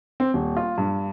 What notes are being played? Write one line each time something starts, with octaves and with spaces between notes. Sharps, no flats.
C4
D#1
F4
G2